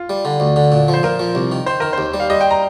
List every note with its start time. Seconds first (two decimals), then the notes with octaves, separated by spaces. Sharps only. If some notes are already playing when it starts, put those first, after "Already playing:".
Already playing: F4
0.10 G3
0.25 D3
0.40 D2
0.56 D3
0.72 A#2
0.88 F3
0.94 C5
1.03 A#2 A#4
1.19 F3
1.35 C2
1.52 D#3
1.66 D#3 C5
1.80 D#3 A#4
1.93 D#2 C5
2.14 G3
2.20 F5
2.30 G3 D#5
2.41 G5
2.51 A#5